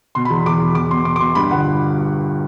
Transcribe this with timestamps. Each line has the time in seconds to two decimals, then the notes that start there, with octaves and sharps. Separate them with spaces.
0.15 B2 C6
0.25 B5
0.30 E2
0.46 E2 D6
0.60 B2
0.75 E2 D6
0.91 B2 C6
1.05 B2 D6
1.16 D6
1.20 B2 C6
1.35 G2 B5
1.51 G1 F#5